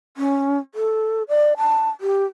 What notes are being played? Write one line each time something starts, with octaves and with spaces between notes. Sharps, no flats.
C#4
A4
D5
A5
G4